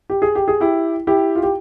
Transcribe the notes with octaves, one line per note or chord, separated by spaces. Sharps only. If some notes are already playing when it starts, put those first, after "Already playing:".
G4
G#4
G4
G#4
E4 G4
E4 G4
F4
G4